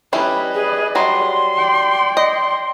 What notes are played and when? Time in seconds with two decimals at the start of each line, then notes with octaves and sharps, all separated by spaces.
0.13 G3 C#4 E4 B4 D#5
0.54 G#4
0.95 F#3 G3 C6
1.57 D5 G5
2.17 D#5 C6